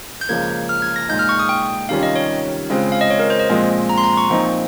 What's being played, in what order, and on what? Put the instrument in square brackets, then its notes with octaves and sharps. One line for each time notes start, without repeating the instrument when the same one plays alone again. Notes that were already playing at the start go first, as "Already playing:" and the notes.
[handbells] G6
[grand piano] C#2 C#3 F3 A#3 [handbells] G#6
[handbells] F6
G#6
A#6
[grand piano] A#2 G#3 D#4 [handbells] G6
[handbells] F6
C#6
D#6
G5
[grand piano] C3 D#3 G3 C#4 F4 [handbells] F5
[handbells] D#5
C#5
[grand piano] C#3 G#3 C4 F4
[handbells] F5
D#5
C#5
A#4
C5
D#5
[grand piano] A#2 F3 G#3 C4 F4
[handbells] A#5
C6
A#5
C#6
[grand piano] A#2 F3 C4 D#4